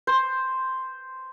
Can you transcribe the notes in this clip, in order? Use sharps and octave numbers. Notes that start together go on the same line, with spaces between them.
C5